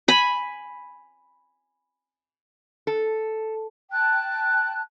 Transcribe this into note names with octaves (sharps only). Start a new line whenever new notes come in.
G#5 B5
A4
G5 A5 F#6